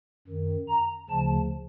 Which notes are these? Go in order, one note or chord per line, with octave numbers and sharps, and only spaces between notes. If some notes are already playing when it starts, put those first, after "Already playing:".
F#2 D#3
A#5
D2 C#3 F3 A5